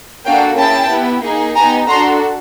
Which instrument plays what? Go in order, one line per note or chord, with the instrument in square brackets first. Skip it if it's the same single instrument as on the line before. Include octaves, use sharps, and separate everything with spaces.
[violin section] A#3 D4 F#4 A4 F5 G5
C#4 E4 G#4 G5 A5
B3 E4 G4
A#3 D#4 G#4
B3 D#4 G4 G#5 A#5
D4 F#4 A4 A#5 C6